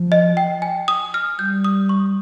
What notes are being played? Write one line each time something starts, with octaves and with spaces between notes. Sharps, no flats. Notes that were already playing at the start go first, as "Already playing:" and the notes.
Already playing: F3
D#5
G5
G#5
D#6
F6
G3 G6
D#6
C#6